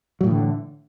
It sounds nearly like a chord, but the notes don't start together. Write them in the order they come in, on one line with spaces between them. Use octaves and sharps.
F#3 A2 E3 D3